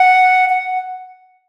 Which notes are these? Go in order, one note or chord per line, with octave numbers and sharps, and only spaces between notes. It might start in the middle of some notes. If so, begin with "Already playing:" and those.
Already playing: F#5
F#5